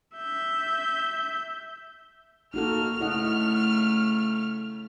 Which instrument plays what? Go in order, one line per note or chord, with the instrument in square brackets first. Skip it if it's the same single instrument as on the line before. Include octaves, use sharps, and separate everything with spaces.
[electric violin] E5 G6
[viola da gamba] A#3 [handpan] D#4 F#4 A4 [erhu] F6
[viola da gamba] C#3 A3 [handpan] E4 D#5 F#5